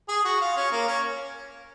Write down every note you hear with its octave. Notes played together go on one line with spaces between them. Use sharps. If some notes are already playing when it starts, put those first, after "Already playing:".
G#4
F#4
F4
C#4
A#3
C#4